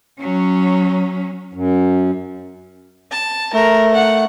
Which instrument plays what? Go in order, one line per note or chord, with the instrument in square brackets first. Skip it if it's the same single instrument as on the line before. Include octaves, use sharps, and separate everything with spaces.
[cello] F#3 C#4
[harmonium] F#2
[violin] A5
[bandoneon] A3 [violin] A#4
[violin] F#5